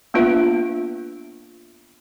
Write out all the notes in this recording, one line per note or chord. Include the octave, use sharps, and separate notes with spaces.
A#3 B3 D4 F4 B4 E5